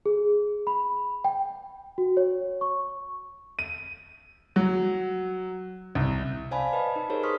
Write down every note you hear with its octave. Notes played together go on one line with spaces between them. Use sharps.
G#4
B5
G5
F#4
C#5
C#6
D#7
F#3
C2
C5 D5 F5 G#5 A5 B5
B4 D#5 A5 B5
D#4
D#4 G4 G#4 A#4 C5 C#5
C6 C#6 D#6 F6 B6